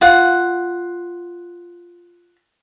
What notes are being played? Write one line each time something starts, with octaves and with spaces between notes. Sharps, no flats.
F4 F#5